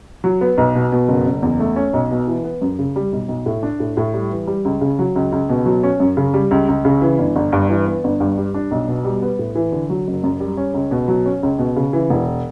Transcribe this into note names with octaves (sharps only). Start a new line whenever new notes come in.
F#3
B3
B1
B2
B2
F#1
F#1
E2
A3
C#4
B1
B2
E3
B3
F#2
C#3
G3
B1
B1
A2
D4
A2
A2
G3
E3
G3
C#2
C#3
F#3
C#2
C#2
B2
F#3
C#4
F#2
C#3
G3
C#2
C#2
C#3
E3
G1
G1
G2
E3
B3
G1
G2
G3
D4
B1
B2
G3
B3
A2
E3
D3
F#3
F#1
F#2
G3
C#4
C#2
B2
F#3
C#4
C#2
B2
C#3
E3
E1